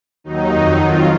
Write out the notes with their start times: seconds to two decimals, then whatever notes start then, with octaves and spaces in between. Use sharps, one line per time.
0.24 D#2 D#3 F#3 D#4
0.52 F2 D#3 F#3
0.80 F2 D#3 F#3 F4